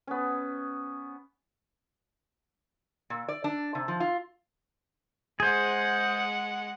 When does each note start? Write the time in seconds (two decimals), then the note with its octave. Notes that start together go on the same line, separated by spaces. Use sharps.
0.07 B3 C#4
3.10 A#2
3.28 D5
3.44 D4
3.75 C3
3.88 F3
4.00 F4
5.40 G#3 G#4 C5 F#5